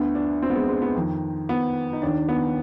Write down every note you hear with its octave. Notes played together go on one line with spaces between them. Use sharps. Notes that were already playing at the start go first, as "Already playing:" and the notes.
Already playing: D2 D3 B3
D4
C4
B3
G#3
G#3
B3
F2 D#3
B3
D#4
D#2 D#3 D4
B3